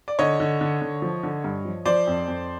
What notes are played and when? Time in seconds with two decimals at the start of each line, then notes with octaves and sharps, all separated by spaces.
0.08 D5
0.19 D3 C#5 D#5
0.40 D3
0.61 D3
0.82 D3
1.02 F3
1.23 D3
1.44 G2
1.65 F3
1.85 F3 C5 D5
2.07 F2
2.28 F2